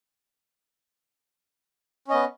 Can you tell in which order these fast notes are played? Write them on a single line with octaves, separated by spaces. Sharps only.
C#4 D#5 B3